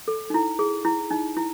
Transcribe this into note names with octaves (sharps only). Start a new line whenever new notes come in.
A4
D#4
E4
G#4
E4
D#4
E4